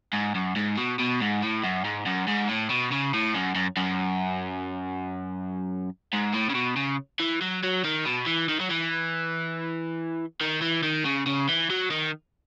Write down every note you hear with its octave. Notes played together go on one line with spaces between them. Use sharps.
G#2
F#2
G#2
B2
B2
G#2
A2
F#2
G#2
F#2
G#2
A2
B2
C#3
A2
F#2
F#2
F#2
G#2
A2
C#3
B2
C#3
E3
F#3
F#3
D#3
B2
E3
D#3
F#3
E3
D#3
E3
D#3
C#3
C#3
E3
F#3
D#3